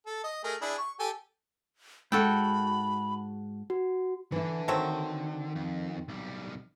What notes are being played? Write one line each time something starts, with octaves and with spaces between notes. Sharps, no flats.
A4
D#5
A3 G#4 A#4
D4 E4 G#4
C#6
G4 A4 G#5
G#2 G#3 F#4 A4 G5 B5
F#4
D3 E3 E4
D#3 F#3 A3 C4
F2
B1 G3